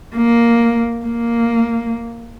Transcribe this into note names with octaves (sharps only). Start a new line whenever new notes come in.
A#3
A#3